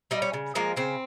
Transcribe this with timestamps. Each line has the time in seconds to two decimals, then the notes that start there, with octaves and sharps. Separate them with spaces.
0.11 G3 D#4
0.22 C#4
0.34 C#3
0.55 F3 G#3 A#3
0.77 C#3 C4